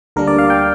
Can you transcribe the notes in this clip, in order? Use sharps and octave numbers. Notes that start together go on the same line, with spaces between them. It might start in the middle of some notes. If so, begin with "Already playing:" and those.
D2 D3 G3 A#3 D4 A#4
D5
F5
G5